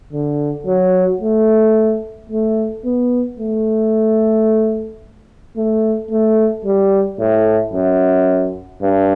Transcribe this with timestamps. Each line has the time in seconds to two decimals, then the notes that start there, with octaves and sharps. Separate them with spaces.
0.13 D3
0.67 F#3
1.22 A3
2.30 A3
2.85 B3
3.40 A3
5.57 A3
6.11 A3
6.65 G3
7.20 A2
7.74 F#2
8.82 G2